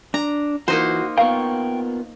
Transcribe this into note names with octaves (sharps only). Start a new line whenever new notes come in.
D4 A#5
E3 A#3 D#4 F4 F#4 C5
B3 F4 A#4 F5 G5 C#6